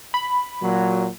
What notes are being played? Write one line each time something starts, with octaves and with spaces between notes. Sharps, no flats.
B5
A#2 F#3